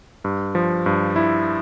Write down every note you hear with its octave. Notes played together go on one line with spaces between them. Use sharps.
G2
F3
G2
E4